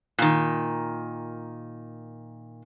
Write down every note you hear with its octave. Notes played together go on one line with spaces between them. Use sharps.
A#2 D#3